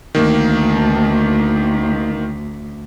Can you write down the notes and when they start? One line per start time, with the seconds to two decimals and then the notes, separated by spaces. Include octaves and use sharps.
0.15 D2 D#3 A#3